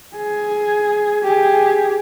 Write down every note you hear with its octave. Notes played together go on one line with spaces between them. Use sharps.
G#4
G4 G#4